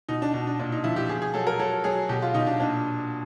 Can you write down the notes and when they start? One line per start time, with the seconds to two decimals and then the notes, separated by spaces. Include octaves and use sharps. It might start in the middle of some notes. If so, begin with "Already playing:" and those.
0.09 B2 D#4
0.22 D4
0.33 B2 D4
0.47 D4
0.59 A#2 D4
0.72 D#4
0.84 F3 E4
0.96 G4
1.09 B2 G#4
1.22 G#4
1.34 F#3 A4
1.47 A#4
1.59 F#3 A4
1.84 F#3 G#4
2.09 B2 G4
2.22 F4
2.34 B2 D#4
2.47 D4
2.60 A#2 D4